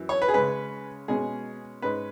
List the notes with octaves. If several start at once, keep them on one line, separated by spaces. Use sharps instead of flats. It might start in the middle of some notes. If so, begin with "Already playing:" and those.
Already playing: F#2 E3
C#5
B4
G#4
C#3 G#3 C#4 B4
B2 G#3 C#4 G#4
G#2 G#3 C#4 B4